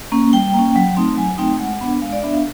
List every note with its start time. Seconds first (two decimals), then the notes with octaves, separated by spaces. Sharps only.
0.12 A#3 C#4
0.33 G3 G5
0.54 A#3
0.59 C#4
0.76 F#3
0.97 A3 C4 D#4
1.17 F#3 G#5
1.38 A3 C4 D#4 G5
1.59 G#3 F#5
1.81 B3 D4
2.02 G#3 F5
2.12 D5
2.23 B3 D4 E5
2.32 F5